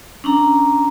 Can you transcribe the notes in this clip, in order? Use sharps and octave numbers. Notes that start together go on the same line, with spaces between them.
C#4 D4 A#5